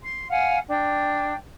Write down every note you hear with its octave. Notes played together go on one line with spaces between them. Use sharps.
C6
F5 F#5 G#5
D4 G5